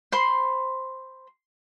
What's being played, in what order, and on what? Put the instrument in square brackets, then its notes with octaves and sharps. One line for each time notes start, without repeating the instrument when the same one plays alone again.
[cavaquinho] C5 B5 C6